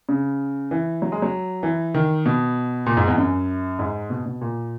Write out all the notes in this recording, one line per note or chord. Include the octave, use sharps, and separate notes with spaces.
C#3
E3
F#3
G#3
F#3
E3
D#3
B2
A#2
G#2
E2
F#2
G#2
B2
B2
A#2